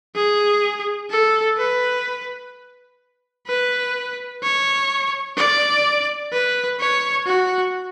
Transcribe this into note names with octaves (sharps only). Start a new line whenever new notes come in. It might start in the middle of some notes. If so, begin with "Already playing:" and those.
G#4
A4
B4
B4
C#5
D5
B4
C#5
F#4